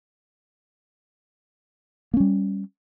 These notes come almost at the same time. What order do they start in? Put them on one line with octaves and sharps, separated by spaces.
A#3 C#4 G3